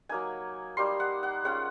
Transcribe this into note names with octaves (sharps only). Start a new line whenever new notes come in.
F#3 A#3 D#4 G#5
G3 A#3 D#4 C6
F#5
F#5
G#3 C#4 F4 F#5